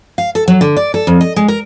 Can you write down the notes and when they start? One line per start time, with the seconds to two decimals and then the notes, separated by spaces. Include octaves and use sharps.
0.18 F5
0.35 A4
0.48 F#3
0.61 D3
0.77 D5
0.94 A4
1.07 F2
1.21 D#5
1.36 G#3
1.48 A#4